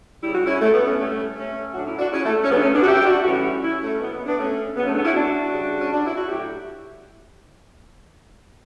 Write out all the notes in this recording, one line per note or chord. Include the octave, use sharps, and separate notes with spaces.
C#3 G3 E4
F#4
C#4 E4
A3
B3
A3 C#4
A2 G3 A3 C#4
A3 C#4
A2 F#3 D4 F#4
C#4 E4
D4 F#4
C#4 E4
A3
C#4
C#3 F#3 B3
D4
A3 C#4
B3 D4
F#4
E4 G4
G4
D4 F#4
F#4
A2 E3 G3 C#4 E4
C#4 E4
A3 C#4
B2 F#3 B3
B3
B3 D4
A3 C#4
C#3 B3
F#3
A3 C#4
B3 D4
C#4 E4
D4 F#4
C#3 G3
C#4
D4
E4
F#4
A2 F#3 E4 G4